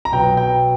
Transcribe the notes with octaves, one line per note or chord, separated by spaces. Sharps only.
A#5
B2 F#3 B3 G5
G5